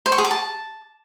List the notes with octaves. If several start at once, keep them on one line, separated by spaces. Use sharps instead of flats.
C5
C#6
G#4
D6
A5